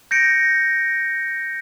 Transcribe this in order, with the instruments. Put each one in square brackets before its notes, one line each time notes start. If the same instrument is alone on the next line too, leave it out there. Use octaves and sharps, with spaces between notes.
[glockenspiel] G6 A#6 C#7 D7